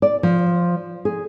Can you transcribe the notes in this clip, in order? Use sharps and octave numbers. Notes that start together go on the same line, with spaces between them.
D5
F3
G#4